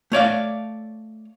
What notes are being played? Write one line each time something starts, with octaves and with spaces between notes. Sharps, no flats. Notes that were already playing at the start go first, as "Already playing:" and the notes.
A3 C#5 D5 F5